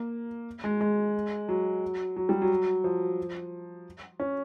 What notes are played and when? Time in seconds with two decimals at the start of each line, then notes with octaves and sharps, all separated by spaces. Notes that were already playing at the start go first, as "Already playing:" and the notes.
Already playing: A#3
0.64 G#3
0.81 G#3
1.49 F#3
2.16 F#3
2.29 G3
2.42 F#3
2.84 F3
4.20 C#4